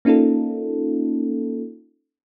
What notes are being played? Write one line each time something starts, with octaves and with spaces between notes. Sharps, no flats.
A#3 C#4 D#4 F4 A4